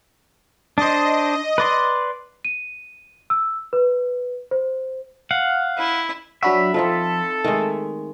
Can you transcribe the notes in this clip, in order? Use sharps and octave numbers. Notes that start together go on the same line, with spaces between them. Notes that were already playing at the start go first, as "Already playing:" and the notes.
D4 C5 D#5
B4 D5 C6
D#7
E6
B4
C5
F5 F#5
E4
F#3 D4 F#4 E5 B5
F3 C4 D#4 F4 A4
D#3 G#3 A3